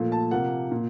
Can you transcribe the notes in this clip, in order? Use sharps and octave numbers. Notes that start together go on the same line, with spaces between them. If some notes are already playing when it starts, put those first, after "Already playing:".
Already playing: A#2 F3 A3
A5
C3 F3 A#3 F#5
A#2